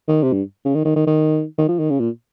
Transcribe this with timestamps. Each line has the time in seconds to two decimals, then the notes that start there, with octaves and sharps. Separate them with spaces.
0.08 D#3
0.23 C3
0.33 G2
0.65 C#3
0.75 D#3
0.85 D#3
0.96 D#3
1.07 D#3
1.58 D#3
1.69 F3
1.79 D#3
1.90 C#3
2.00 A#2